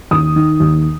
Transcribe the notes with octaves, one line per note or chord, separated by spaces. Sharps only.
D#2 D#6
D#3
D#2